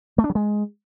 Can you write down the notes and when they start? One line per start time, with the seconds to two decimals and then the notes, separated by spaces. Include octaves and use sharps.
0.18 A3
0.24 D4
0.30 F#3
0.35 G#3